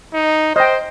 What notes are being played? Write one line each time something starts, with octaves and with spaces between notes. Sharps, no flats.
D#4
C5 D#5 G5